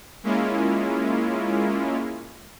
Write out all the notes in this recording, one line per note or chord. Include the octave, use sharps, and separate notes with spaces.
G#3 A#3 C#4 E4 F4